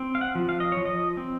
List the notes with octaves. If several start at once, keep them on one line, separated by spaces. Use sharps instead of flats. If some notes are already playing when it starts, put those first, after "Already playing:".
Already playing: C4
F5
F#5
F3
F5
D#5
F3 C#5
D#5
C4